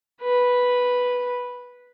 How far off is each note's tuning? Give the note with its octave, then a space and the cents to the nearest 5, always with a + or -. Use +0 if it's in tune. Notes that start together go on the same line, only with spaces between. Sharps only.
B4 -5